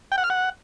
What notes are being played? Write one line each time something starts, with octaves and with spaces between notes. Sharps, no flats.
G5
F#5
F6
F#5